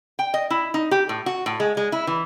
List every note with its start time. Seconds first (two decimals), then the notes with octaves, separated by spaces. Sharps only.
0.19 G5
0.34 D#5
0.51 E4
0.74 D#4
0.91 G4
1.09 A2
1.26 F#4
1.46 A2
1.60 G#3
1.77 G#3
1.92 E4
2.07 E3